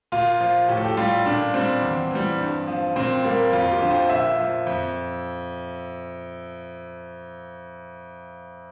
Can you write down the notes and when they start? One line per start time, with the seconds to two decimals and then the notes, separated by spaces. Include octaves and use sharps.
0.12 A#2 F4
0.40 F3
0.68 A2 G4
0.77 A4
0.85 G4
0.97 G3 F4
1.26 A#2 D4
1.54 G3 C4
1.82 E2
2.11 E3 G3
2.39 G2
2.67 F3
2.96 A#2 C4
3.24 G3 A#3
3.53 F2 F4
3.72 G4
3.81 D3 F3
3.90 C5
4.09 A#2 E5
4.38 F3
4.67 F2